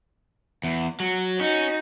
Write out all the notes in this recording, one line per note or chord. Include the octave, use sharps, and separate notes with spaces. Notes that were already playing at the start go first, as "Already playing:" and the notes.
E2
F#3
C#4 D#4 F#4